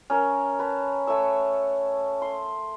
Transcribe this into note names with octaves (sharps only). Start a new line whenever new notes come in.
C#4 A#4
B4 A5 A#5
A3 C#5 C#6 E6
C6